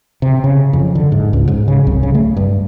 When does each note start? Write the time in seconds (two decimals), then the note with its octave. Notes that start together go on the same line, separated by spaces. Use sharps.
0.22 C3
0.44 C#3
0.73 F2
0.95 D3
1.12 G#2
1.33 C#2
1.48 G#2
1.68 C#3
1.87 C2
2.03 C#3
2.15 A3
2.37 G2